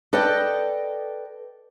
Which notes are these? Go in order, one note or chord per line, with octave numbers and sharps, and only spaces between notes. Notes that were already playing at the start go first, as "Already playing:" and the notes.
A4 B4 D5 D#5 G5